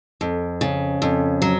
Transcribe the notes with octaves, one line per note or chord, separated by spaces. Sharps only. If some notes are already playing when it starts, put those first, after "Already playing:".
F2
C#3
F2
F#3